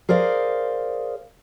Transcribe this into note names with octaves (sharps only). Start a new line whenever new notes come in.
G#4 A#4 C5 D5 F5